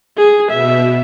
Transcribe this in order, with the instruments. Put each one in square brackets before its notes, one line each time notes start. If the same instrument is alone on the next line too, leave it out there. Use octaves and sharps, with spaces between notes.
[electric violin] G#4
[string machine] B2 [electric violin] E5